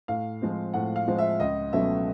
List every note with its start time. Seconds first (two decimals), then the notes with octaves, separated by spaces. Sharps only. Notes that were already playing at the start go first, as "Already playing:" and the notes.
0.08 A2 F5
0.42 F3 G#3 C4
0.74 A2 F#5
0.96 F5
1.08 F3 G#3 C4
1.19 E5
1.40 C#2 D#5
1.73 B2 F#3 A3 C#4 E5